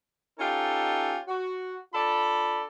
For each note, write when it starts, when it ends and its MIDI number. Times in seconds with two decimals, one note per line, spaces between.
0.39 1.16 61
0.39 1.16 63
0.39 1.16 65
0.39 1.16 67
0.39 1.16 69
1.28 1.76 66
1.93 2.63 62
1.93 2.63 65
1.93 2.63 69
1.93 2.63 74
1.93 2.63 83